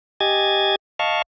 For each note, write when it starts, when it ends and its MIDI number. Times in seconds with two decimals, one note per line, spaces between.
0.20 0.76 67
0.20 0.76 75
0.20 0.76 80
0.20 0.76 92
0.20 0.76 93
0.99 1.22 75
0.99 1.22 77
0.99 1.22 81
0.99 1.22 85
0.99 1.22 89